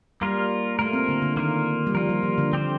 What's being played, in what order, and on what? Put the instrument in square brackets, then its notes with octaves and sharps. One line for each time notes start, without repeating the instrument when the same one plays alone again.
[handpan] G3 [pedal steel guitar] A#3 F4 A#4
[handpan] A3 [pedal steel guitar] A#3 F4 A#4
[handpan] C4
D3
D3
[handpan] D#3 [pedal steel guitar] A#3 F4 A#4
[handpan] G3
[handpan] F3 [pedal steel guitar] A#3 F4 A#4
[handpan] G3
F3
D3
[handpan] D3 [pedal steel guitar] C4 G4 C5